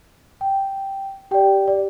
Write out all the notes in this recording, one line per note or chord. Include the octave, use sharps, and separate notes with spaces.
G5
G4 D5 G5
D5